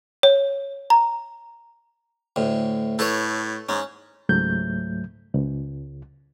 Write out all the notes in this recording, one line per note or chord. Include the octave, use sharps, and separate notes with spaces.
C#5
A#5
D2 A2
A2 A4 B4 C#5
G#2 C#4
C#2 G#2 F#3 A3 G6
C#2